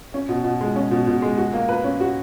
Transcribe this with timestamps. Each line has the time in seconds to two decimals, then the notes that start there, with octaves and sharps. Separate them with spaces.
0.14 C#4
0.29 B2
0.44 B2
0.61 G#3
0.76 C#4
0.91 B2
1.07 B2
1.22 G#3
1.37 F#4
1.53 A#3
1.69 B4
1.84 C#4
2.01 F#4